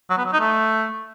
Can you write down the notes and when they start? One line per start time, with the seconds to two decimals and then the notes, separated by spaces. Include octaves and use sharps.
0.10 F#3
0.18 B3
0.25 F#3
0.33 D#4
0.41 A3